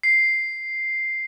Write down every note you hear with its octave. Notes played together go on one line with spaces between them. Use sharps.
C7